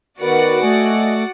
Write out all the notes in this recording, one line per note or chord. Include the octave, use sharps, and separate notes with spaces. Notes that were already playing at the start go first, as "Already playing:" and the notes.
D#3 B3 F#4 A#4 B4 D5 F#5
A3 D#5 G#5